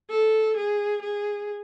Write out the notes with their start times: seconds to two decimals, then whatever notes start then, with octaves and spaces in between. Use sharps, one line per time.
0.10 A4
0.57 G#4
1.02 G#4